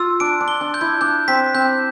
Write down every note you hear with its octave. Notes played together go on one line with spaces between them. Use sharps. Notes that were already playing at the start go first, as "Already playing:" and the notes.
Already playing: F4 E6
D4 D7
D4
G7
D4
G6
E4
D4 G6
C4 B6
C4 G6